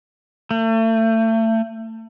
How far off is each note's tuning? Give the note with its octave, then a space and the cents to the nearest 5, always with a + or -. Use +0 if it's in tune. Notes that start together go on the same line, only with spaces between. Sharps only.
A3 +35